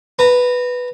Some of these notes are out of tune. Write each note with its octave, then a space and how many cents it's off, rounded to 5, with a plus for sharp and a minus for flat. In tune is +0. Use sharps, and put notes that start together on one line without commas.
B4 +0 A#5 -25